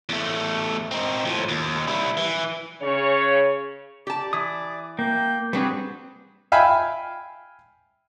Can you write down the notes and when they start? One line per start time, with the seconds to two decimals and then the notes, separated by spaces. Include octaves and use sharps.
0.09 E2 A3
0.91 C4 D#4
1.25 A2 F3
1.49 D#2
1.88 G3 E4
2.17 E3
2.82 C#3 C#5
4.07 G4 D5 A5
4.33 E3 D#6
4.99 A#3 G5
5.53 G3 C4 D4 F#4 G#4 B4
6.52 E5 F5 G5 G#5 B5